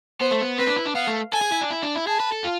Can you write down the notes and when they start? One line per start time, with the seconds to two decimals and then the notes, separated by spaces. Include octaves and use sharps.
0.20 B3 C5
0.31 A3
0.41 B3
0.58 C4 B4
0.67 D4
0.76 E4
0.86 D4
0.95 B3 F5
1.07 A3
1.32 A4 G#5
1.41 G#4
1.52 E4
1.61 D4
1.70 E4
1.82 D4
1.95 E4
2.07 G#4 A5
2.20 B4
2.32 A4
2.44 F4